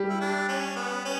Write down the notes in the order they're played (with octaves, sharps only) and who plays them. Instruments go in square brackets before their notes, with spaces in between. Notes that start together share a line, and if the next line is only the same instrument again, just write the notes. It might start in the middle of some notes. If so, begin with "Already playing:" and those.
Already playing: [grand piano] G3 G4
[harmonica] E4
D4
C#4
B3
C#4